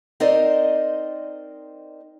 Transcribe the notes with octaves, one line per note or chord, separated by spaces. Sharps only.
C4 D#4 A#4 C5 D5 D#5